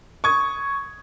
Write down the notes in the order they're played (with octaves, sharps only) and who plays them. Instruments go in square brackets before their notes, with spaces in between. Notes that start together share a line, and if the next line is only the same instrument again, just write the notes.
[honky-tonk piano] C#6 D#6 G#6